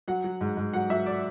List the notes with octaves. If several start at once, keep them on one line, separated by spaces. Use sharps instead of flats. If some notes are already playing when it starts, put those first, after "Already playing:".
F#3 F#5
F#3
G#2
G#2
F#3 F#5
F#3 E5
D5